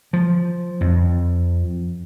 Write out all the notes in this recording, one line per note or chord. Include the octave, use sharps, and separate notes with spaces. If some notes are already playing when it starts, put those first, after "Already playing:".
F3
F2